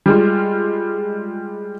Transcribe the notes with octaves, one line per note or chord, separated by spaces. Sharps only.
G3 G#3 F4